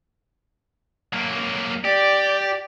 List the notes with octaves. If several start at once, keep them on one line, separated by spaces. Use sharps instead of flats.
F#3 A#3
G4 D5